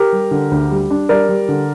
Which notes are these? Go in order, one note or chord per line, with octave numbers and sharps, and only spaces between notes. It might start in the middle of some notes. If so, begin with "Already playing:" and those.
Already playing: G4 A#4
G3
D3
D2
G3
D4
G3 A#4 D5
G3
D3